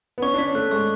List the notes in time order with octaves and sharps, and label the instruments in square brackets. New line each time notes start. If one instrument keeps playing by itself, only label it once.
[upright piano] B3
[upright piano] C#4 [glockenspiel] C#6
[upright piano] D4
[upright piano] C#4 [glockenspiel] B6
[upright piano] A3 [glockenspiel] F#6
[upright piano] G#3 [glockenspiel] C#6